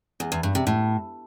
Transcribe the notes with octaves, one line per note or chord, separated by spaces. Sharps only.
E2
E2
G2
C3
A2